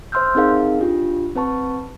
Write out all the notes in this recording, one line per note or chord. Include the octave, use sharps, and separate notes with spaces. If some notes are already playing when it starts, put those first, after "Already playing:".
C5 E5 C6 E6 F6 G6
C4 D#4 G#4 A#4 F5
D4 F4 G4
C4 B4 A5 C#6